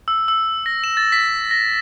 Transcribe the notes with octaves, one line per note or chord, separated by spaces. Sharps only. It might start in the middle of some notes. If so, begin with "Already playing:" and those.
E6
E6
A#6
E7
A6
B6
A#6